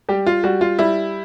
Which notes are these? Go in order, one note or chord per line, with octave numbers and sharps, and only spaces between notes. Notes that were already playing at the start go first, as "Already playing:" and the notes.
G3 G4
F4
G3 F#4
F4
G3 E4